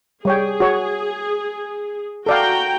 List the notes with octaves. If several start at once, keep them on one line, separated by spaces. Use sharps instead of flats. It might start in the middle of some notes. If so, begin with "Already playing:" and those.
G3 G#4 C#5 G5
F#4 C#5
F#4 A4 D5 F5 G5 A#5